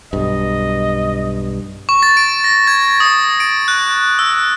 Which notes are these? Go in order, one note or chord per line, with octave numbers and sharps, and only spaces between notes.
B1 G2 D#5
C#6
A6
D7
A#6
G#6
D#6
D7
F#6
E6